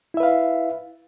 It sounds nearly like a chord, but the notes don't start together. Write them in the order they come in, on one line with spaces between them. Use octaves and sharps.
E4 E5 B4 F5